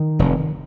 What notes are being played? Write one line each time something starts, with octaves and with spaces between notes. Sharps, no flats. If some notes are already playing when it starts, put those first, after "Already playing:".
Already playing: D#3
F1